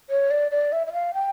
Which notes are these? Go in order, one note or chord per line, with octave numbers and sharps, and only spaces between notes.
C#5
D5
D5
E5
E5
F5
G5